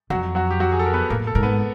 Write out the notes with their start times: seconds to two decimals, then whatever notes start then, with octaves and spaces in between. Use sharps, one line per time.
0.10 F2 F#3 F#4
0.35 F#3 F#4
0.51 G4
0.60 F#3 F#4
0.72 G#4
0.79 A4
0.86 A#4
0.93 B3 B4
1.10 A2 A#3 A#4
1.27 A4
1.35 G#2 A#4
1.43 B3 B4